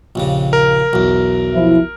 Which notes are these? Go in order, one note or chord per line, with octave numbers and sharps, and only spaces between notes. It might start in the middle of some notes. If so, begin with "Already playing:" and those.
A#1 D#2 C#3
A#4
B1 E2
F3 E4